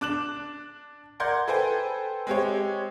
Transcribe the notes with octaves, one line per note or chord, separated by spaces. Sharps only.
D4 D6 F#6 E7 F#7
A#4 D5 F#5 C6 G6 G#6
A4 B4 C5 G5 G#5
G#3 C4 G4 C#5